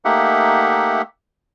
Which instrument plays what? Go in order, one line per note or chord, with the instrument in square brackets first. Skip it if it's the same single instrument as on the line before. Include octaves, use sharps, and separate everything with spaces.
[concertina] A3 A#3 D#4 G4 E5 F#5